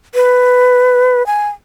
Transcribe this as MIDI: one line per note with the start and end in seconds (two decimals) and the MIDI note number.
0.15 1.25 71
1.26 1.48 80